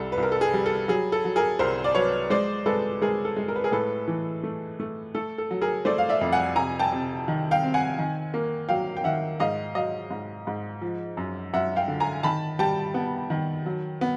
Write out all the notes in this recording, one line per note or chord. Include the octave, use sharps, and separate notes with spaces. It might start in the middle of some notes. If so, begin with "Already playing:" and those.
Already playing: C2 G3 A4
B4
C2
A#4
A4
G#4
G3
A4
F#3 G#4
A4
F#3
G#4 A#4
C2 A#4 C5
D5
F#3 B4 C#5
G#3 C5 D5
G#3 A4 B4
G#3 G#4 A#4
A4
G#3
A#4
B4
G#4 A#4
A2 A4 B4
E3
A3
A3
A3 A4
A4
F#3
G#4 A#4
A3 C5 D5
F5
D5 E5
F2
F#5 G#5
C3 G#5 A#5
G5 A5
C3
D#3
F5 G5
C4
F#5 G#5
D#3
A#3
F#3 F5 G5
G5
D#3 E5 F#5
G#2 D#5 F5
F#3 D#5 F5
G#2
G#2
F3
F#2
F#2 E5 F#5
F5 G5
D3
G#5 A#5
D#3 A5 B5
G3 G5 A5
B3
D#3
F#3
B3